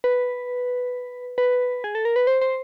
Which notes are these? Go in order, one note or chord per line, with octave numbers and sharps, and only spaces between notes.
B4
B4
G#4
A4
A#4
B4
C5
C5